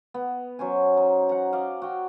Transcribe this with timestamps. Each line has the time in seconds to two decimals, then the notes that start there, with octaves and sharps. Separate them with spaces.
0.14 B3
0.59 F#3 C#4 C5 G#5
0.97 D#4
1.29 F#5 A#5
1.53 D5 D#5 F5
1.82 F#4 G5